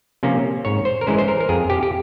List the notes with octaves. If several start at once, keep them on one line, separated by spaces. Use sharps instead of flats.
C3 F3 A#3 C#4
G#2 C#5
C5
A#4
E3 G#3 C#4 C5
C5
A#4
A#4
F2 G#4
G4
G4